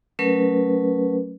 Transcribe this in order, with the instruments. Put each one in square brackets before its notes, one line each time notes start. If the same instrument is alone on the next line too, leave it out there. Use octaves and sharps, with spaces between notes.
[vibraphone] F#3 A3 C#4 A#4 B4